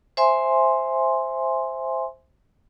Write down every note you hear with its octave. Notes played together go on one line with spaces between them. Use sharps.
C5 E5 G#5 C6